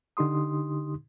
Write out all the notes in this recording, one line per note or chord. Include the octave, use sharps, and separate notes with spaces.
D3 D#4 G4 C6 D#6